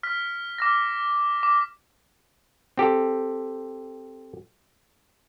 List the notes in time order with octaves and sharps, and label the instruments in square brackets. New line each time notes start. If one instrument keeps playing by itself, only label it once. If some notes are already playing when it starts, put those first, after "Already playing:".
[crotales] F6 B6
D6 F6 A#6
D6
[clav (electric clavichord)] C4 G4 A4